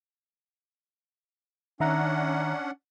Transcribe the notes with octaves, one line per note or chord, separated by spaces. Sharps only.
D#3 C#4 D4 E5 F#5 A#5